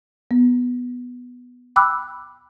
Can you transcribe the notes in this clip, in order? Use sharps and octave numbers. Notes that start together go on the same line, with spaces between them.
B3
G5 B5 D6 E6 F#6